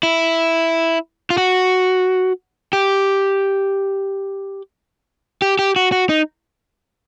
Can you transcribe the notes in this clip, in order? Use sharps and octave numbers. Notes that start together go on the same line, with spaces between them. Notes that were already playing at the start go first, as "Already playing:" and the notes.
E4
F4
F#4
G4
G4
G4
F#4
F#4
D#4